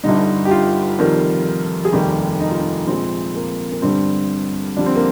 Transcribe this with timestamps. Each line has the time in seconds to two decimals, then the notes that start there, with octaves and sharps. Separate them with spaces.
0.04 G1 G2 D3 G3 D#4
0.45 G4
0.51 F4
0.99 F1 F2 D#3 G3
1.85 G#4
1.93 F1 D#2 D#3 G3 G4
2.40 D#4
2.51 F4
2.62 D#4
2.87 A#1 A#2 F3 G#3 C4
3.35 A#3
3.71 A#3
3.82 G1 G2 D3 G3 C4
4.77 F2 D3 G3 D4
4.86 C4
4.95 A#3